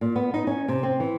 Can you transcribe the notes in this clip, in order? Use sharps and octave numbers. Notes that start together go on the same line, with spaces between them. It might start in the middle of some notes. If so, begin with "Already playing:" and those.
A#2
B3
D#4
C#4
C3
C4
E3